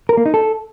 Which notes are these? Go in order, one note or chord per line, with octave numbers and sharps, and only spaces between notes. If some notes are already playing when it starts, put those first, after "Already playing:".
A#4
A#3
D#4
A4